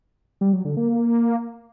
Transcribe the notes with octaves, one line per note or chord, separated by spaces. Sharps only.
G3
F#3
D3
A#3
A#3